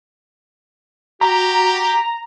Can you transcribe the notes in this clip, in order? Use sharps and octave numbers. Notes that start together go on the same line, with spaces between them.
F#4 G4 A#5